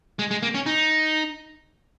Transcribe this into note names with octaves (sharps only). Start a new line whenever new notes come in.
G#3
G#3
A#3
C#4
D#4